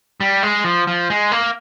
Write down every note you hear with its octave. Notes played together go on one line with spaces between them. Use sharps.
G3
G#3
F3
F3
G#3
A#3